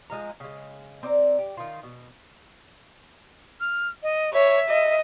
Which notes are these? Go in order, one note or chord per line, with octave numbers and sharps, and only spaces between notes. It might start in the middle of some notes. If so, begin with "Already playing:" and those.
F3 G#3 F5 A#5
C#3 G#3
C4 D5 D#5 A#5
G4
D#3 F4
B2
F6
D#5
C#5 E5
D#5